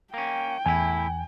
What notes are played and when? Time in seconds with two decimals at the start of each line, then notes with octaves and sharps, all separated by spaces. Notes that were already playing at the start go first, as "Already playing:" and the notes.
0.14 A#3 C#4 G5
0.66 E2 A2 E4 G#5